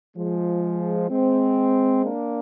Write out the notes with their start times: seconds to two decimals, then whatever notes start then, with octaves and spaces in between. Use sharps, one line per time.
0.16 F3 G#3
1.10 G#3 C4
2.04 A#3 D4